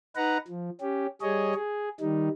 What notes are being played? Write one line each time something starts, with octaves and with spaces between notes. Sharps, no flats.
D#4 B4 F#5 A#5
F3
C#4 G4
G3 G#4 C#5 D#5
G#4
D#3 G3 D#4